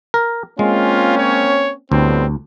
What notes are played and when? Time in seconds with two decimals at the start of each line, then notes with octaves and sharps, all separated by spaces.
0.14 A#4
0.59 G#3 A#3 C4 C#4 F4
1.18 C#5
1.92 D2 A2 G3 B3 C4